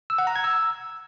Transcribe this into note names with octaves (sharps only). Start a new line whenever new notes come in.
E6
F#5
A#5
G#6
E6